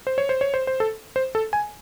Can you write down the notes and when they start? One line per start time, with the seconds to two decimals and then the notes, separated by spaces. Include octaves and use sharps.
0.07 C5
0.18 C#5
0.29 C5
0.41 C#5
0.54 C5
0.67 C5
0.80 A4
1.16 C5
1.35 A4
1.53 G#5